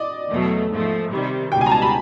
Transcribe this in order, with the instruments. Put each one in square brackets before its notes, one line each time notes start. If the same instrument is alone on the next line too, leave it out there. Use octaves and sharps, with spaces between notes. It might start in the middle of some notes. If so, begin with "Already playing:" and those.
Already playing: [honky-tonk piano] D5 D#5
[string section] E2 B2 F#3 A3
G#2 F3 A3
C3 D#3 G3
[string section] C#2 B2 G3 [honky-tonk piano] G5
[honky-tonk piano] G#5
A#5
A5
B5